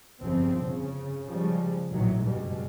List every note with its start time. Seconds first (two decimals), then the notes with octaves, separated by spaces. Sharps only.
0.21 G1 F2 C#3 F3 C4
0.63 C#3
1.28 C#3 F3 G3 G#3
1.90 A1 A#2 D#3 E3 F#3
2.24 F#1 G2 B2 G3 G#3